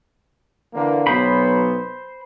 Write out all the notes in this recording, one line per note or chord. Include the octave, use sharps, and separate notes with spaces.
D3 E3 A#3
B1 F#3 B3 C5 B5